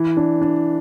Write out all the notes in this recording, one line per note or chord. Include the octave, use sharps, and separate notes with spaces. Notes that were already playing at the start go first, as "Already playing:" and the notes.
Already playing: E3
D4
D4